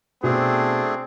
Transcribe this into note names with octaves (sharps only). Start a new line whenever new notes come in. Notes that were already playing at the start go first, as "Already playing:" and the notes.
B2 A3 C4 D4 G#4